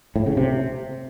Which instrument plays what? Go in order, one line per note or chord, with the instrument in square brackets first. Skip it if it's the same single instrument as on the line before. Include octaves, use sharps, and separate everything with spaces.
[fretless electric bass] A2
C#3
C3